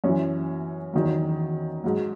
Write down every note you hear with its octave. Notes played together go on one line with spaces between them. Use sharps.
F#2 E3 C#4
E2 D#3 F#3
G#2 F#3